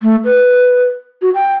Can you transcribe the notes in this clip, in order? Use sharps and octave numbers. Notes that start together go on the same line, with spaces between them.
A3
B4
F#4
G5